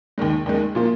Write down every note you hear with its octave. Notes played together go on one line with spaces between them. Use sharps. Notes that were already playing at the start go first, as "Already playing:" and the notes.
D#2 D#3 G#3
D#2 D#3 G#3
A#2 F3 A#3